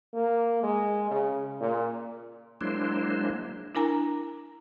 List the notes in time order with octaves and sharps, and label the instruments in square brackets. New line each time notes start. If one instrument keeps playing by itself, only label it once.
[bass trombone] A#3
G#3
C#3
A#2
[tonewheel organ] F#3 G#3 A#3 D4 E4 C5
[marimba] D4 E4 A#4 G#5 A#5